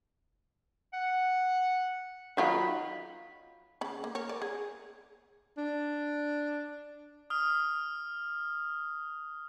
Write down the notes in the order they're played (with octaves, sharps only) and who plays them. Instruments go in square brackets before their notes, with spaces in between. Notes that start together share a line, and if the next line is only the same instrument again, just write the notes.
[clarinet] F#5
[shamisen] D#3 F#3 F4 [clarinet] B5
[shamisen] C#3 B5
A#3
A#4 C#5
D5
G#4
[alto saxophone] D4
[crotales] D#6 F6